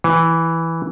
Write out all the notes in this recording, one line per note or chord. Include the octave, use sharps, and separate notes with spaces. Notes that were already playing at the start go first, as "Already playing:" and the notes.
E3